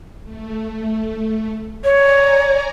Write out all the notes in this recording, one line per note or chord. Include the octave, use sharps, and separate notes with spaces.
A3
C#5 D5 G#5 A#5